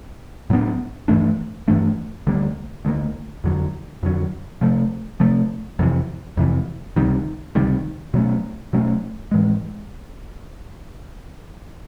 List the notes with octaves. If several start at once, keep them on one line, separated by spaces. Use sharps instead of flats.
A2 F#3 B3 D4
G2 E3 A3 D4
G2 E3 A3 D4
D2 D3 G3 A#3
D2 D3 G3 A#3
F2 D3 F#3
F2 D3 F#3
C3 F3 A3
C3 F3 A3
F2 C3 E3
F2 C3 E3
C#2 C3 D#3 G3
C#2 C3 D#3 G3
B2 F#3 A3 C#4
B2 F#3 A3 C#4
A2 E3 G#3